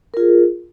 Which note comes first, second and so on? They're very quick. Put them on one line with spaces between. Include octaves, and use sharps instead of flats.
A#4 F4 G#4